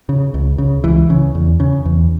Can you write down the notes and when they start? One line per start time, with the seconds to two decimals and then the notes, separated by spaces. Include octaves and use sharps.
0.09 C#3
0.34 C#2
0.58 C#3
0.84 C#2 E3
1.10 C#3
1.35 E2
1.60 C#3
1.85 E2